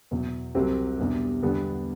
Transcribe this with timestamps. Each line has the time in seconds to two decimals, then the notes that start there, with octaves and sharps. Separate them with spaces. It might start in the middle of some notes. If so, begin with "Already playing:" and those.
0.11 E2 B2 F#3
0.55 C2 C3 F#3 C4 G4
0.98 E2 B2 G3 D4 G4
1.42 E2 D3 G3 B3 D4